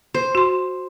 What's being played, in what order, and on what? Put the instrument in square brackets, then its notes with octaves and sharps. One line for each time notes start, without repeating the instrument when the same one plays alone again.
[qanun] C5
[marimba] F#4 C6